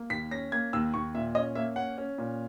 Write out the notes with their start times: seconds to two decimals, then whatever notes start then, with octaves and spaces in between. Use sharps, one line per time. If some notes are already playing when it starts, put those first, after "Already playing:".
Already playing: A#3
0.10 D#2 B6
0.31 C#4 A#6
0.52 A#3 G#6
0.73 D#2 E6
0.94 D#2 C#6
1.15 A#2 E5
1.35 C#4 D#5
1.55 A#3 E5
1.76 C#4 F#5
1.98 C#4
2.18 A#2